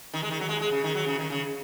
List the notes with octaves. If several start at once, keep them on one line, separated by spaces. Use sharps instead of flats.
D#3
G#3
D#3
F#3
G#3
G#3
C#3
D#3
F#3
C#3
D#3
C#3